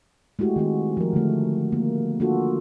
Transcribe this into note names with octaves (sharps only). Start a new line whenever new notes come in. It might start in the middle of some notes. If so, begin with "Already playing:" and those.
G#3 A3 E4 F#4 G4
D#3 C4 F#4
F3 A#4
D3 A3
A#3
A#3 D4 F4 F#4 A4